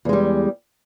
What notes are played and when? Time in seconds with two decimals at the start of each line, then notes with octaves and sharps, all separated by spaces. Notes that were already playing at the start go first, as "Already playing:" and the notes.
0.05 E2
0.09 G#3
0.13 G3